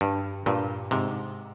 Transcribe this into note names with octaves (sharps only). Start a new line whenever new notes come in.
G2
G2 A#2
G#2 C3